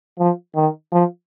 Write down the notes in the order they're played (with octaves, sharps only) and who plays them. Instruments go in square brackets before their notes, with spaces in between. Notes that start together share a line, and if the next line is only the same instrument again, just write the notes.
[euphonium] F3
D#3
F3